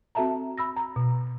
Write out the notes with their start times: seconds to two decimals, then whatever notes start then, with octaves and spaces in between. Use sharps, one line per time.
0.15 C4 F#4 A4 E5 A5 A#5
0.58 B5 E6 A#6
0.77 A#5
0.96 B2